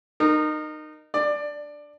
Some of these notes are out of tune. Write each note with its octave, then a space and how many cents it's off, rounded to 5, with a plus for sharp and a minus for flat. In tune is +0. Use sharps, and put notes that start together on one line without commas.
D#4 -25 A#4 +0
D4 +0 D5 +20